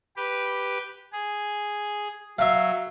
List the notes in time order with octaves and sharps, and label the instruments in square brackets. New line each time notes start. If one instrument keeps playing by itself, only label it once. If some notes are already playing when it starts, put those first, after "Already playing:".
[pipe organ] G4 B4
G#4
[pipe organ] F#3 [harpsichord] E5 F5